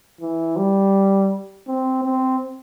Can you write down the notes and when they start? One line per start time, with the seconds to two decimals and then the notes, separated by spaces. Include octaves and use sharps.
0.21 E3
0.57 G3
1.67 C4
2.04 C4